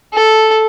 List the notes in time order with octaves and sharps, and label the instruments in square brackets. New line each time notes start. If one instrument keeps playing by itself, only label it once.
[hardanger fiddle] A4